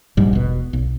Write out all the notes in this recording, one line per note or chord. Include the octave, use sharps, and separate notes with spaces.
A#1 G#2 G3
E1 B2
B1